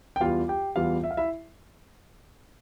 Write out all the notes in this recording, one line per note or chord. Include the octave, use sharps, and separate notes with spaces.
G5
E2 E3 G3 F4 F5
G4 G5
E2 E3 G3 F4 F5
E5
F5
E4 E5